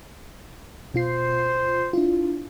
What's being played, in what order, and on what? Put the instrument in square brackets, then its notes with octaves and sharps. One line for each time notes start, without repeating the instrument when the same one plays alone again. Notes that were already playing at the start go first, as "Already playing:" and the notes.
[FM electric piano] B2 F4 C7 [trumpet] C5
[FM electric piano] D4 E4 F4